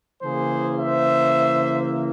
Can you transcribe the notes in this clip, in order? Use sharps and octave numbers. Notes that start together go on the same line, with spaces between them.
C#3 E3 A#3 G#4 C5
C5 E5